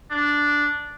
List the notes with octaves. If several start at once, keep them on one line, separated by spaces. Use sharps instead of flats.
D4